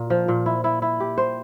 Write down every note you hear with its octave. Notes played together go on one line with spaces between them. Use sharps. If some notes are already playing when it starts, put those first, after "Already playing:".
Already playing: A#2 A#3
F3
A#2
E4
E4
E4
G4
C5